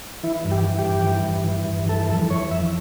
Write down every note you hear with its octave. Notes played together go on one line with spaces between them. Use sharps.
E3 E4
G2
G4
E3
G4
G2
E3
G2
E3
G2
E3 A4
F2 A4
E3 C#5
F2 E5